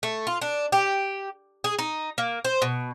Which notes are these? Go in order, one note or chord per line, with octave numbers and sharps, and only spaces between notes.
A3
F4
D4
G4
G#4
D#4
A#3
C5
B2